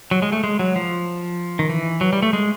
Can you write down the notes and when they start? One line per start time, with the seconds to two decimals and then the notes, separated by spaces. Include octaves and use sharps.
0.11 F#3
0.22 G#3
0.32 A3
0.44 G#3
0.59 F#3
0.76 F3
1.59 D#3
1.70 E3
2.01 F#3
2.13 G3
2.23 A3
2.33 G#3